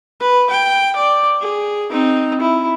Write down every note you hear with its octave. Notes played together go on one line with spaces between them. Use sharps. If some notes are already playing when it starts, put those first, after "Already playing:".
B4
G5
D5
G#4
C4 D#4
E4